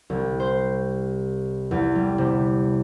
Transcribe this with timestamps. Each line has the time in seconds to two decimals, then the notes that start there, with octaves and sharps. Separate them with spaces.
0.10 C2
0.40 C5
1.71 E2
1.95 G3
2.18 C3